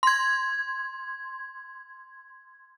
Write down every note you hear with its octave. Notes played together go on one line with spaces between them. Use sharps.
C6 G#6